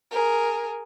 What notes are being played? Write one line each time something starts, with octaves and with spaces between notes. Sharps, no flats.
G#4 A#4